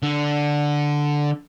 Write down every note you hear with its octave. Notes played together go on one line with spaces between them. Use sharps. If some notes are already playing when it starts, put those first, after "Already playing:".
D3